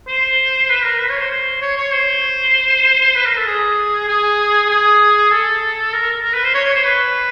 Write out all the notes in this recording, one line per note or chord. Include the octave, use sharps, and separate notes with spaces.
C5
B4
A#4
B4
C#5
C5
C5
C#5
C#5
C5
B4
A#4
A4
G#4
G#4
G#4
A4
A#4
A#4
B4
C5
C#5
C#5
C5
B4